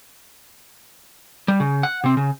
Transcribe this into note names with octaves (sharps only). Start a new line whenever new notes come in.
G3
C#3
F#5
C3 C4
C#3